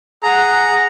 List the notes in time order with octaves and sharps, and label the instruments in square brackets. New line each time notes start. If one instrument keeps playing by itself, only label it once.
[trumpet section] G#4 F#5 [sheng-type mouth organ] A#5